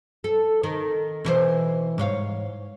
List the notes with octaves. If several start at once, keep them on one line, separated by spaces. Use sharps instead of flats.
A4
D#3
B2 E3 C5
G#2 C#5 F5